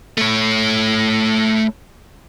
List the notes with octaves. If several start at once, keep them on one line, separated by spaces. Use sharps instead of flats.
A3 C#5